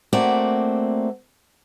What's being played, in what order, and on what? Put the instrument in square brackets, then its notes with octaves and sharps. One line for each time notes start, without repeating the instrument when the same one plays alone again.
[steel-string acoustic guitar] A3 A#3 C4 F#4 D5